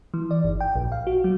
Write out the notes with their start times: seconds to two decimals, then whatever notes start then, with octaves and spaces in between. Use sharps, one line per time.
0.14 E3
0.31 D5
0.44 G1
0.60 G5
0.75 A#1
0.92 F5
1.07 F#4
1.24 F#3